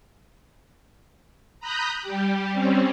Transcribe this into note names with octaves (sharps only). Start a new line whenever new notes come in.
A#5 B5 D#6 F#6 G6
G3 G4
G3 C4 C#4